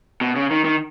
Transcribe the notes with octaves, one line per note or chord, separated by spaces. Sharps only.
B2
C#3
D#3
D#3